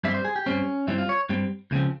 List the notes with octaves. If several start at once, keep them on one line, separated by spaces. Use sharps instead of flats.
G2 G3 C4 E5
C5
G#4
G4
G2 G3 C4 C#4
G2 G3 C4 E4
F4
C#5
G2 G3 C4
C#2 C#3 F3 C4